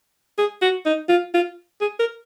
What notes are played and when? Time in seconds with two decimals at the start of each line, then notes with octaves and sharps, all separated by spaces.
0.38 G#4
0.61 F#4
0.86 D#4
1.09 F4
1.34 F4
1.81 G#4
1.99 A#4